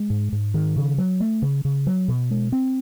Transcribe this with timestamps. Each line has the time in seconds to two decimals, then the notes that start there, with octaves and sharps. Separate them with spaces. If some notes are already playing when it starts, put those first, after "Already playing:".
Already playing: G#3
0.10 G#2
0.32 G#2
0.54 D#3
0.76 C#3
0.98 F#3
1.20 A3
1.42 C#3
1.65 C#3
1.87 F#3
2.08 B2
2.31 G#3
2.52 C4